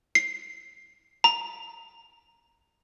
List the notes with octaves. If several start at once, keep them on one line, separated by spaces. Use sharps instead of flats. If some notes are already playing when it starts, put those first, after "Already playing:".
C7
A#5